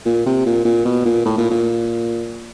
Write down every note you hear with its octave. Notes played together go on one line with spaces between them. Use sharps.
A#2
C3
A#2
A#2
B2
A#2
A2
A#2
A#2